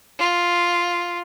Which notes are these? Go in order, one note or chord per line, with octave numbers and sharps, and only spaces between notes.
F4